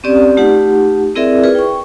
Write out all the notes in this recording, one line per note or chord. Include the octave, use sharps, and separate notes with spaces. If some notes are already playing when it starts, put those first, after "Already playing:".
C4 C#4 G4 D5
A3 D#4 F4 G4 F#5
C4 E4 G#4 A#4 D5 E5
F4 G#4 B4
G5 C#6